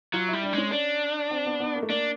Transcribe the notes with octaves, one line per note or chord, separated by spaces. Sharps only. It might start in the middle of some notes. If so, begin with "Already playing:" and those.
F#3 F4
G3 E4
D4
G#3 C#4
D4
C4
B3
B3
A#3
A3
A#3 D4